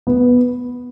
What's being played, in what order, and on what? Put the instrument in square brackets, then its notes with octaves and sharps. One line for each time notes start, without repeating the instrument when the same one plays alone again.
[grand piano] B3